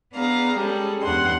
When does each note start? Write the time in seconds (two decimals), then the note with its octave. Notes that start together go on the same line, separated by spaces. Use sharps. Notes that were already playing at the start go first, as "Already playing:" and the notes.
0.14 B3 D4 G#4 F5 A#5
0.57 G3 G#3 C#4 G#4 A4
1.03 E2 G2 F#5 C6